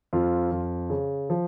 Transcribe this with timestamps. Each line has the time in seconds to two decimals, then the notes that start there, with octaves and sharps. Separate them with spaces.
0.13 F2 F4
0.52 F2
0.90 C#3
1.30 F3